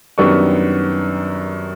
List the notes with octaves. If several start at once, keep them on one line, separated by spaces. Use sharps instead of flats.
F#2 D#3 G3 B3 D4 C#6